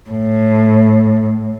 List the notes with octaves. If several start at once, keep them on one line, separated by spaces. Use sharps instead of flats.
A2